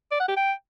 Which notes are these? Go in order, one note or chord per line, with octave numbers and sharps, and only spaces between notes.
D5
F#5
G4
G5